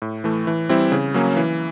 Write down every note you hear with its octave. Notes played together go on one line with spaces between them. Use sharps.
A2
E3 A3
E3
G3 C4 E4
C#3
F#3 A#3 C#4
E3